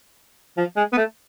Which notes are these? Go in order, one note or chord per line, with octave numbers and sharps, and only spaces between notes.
F3
G#3
B3
A3